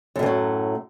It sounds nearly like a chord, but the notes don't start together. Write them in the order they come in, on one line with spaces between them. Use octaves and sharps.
F#2 A2 E3 F#3